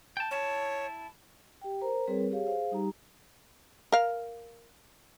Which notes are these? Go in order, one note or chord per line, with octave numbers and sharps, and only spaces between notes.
G5 A5
E4 C#5 A5
G4 G5
A#4 C5 A#5
G3 C4 G#4 A#4 B4 C#5
G4 G#4 C#5 F5
G#4 C5 F5
G3 D#4 G4 A#5
A#4 F5